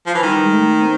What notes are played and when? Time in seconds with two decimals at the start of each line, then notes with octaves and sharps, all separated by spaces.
0.07 F3
0.15 E3
0.23 D#3 G3
0.45 G#3
0.52 A3
0.81 C4